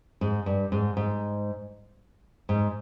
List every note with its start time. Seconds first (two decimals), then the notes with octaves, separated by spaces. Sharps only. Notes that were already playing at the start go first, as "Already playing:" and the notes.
0.21 G#2
0.46 G2
0.72 G#2
0.97 G#2
2.49 G#2